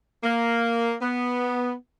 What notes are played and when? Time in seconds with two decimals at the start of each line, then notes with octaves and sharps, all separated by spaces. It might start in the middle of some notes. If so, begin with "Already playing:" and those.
0.23 A#3
1.02 B3